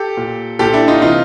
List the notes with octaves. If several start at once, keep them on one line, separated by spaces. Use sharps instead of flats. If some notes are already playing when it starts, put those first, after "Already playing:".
Already playing: G4 A4
A#2
A#2 G4 A4
D4 E4
D#4 F4
C3 E3 D#4 F4